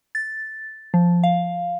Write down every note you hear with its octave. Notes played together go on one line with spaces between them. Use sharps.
A6
F3
F5